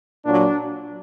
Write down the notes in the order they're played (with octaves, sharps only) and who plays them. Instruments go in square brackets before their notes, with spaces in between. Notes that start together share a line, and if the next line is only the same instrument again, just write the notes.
[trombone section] A#2 F#3 D4